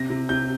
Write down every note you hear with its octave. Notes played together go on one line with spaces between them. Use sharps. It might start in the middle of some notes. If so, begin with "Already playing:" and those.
Already playing: C3 A#6
C3
C3 G6